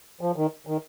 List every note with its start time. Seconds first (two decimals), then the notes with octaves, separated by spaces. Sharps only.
0.21 F3
0.36 D#3
0.67 D#3